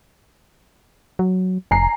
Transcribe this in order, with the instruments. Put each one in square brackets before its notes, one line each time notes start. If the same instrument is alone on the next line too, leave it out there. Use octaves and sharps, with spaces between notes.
[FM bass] F#3
[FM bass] F1 [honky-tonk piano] G#5 A#5 C7